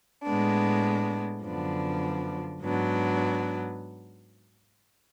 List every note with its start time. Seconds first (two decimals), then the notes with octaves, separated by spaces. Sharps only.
0.25 A2 G#3 B3 D4
1.43 F#2 D3 F3 B3 D4
2.62 G#2 F#3 B3 D4